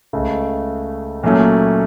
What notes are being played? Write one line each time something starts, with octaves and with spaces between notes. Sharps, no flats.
C#2 C#3 A3
A#2 F#3 A3 C#4